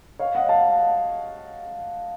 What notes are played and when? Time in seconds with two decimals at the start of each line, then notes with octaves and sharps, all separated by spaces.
0.19 C#5 F5
0.35 D#5 F#5
0.49 F5 A5